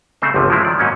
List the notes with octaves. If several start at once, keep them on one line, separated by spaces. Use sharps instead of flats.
C#3 A3 C4 D#4 C5
G1 C#2 C3 F3
F3 F#3 G#3 C4 E4
D#3 D5
G#2 F#3 A#3 C#4 D#4